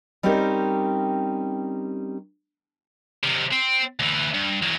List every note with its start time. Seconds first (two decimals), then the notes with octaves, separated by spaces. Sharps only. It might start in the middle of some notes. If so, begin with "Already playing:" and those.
0.23 G3 C4 C#4 D#4 G4 A#4
3.23 C3 D#3
3.52 C4
4.00 D2 E3
4.34 G2
4.62 E2 F#3